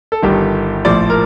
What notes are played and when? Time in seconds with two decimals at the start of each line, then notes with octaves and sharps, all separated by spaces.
0.12 A4
0.22 G1 G2 D#3 G4
0.85 A#1 A2 F3 D5
1.10 A#4